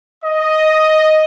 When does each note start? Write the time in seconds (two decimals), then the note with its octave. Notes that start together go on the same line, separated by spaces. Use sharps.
0.24 D#5